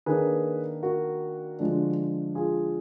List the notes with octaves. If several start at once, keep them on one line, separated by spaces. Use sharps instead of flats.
D#3 A#3 D4 G#4 B4
F#4 A#4
D3 F3 G#3 D4
F4 G#4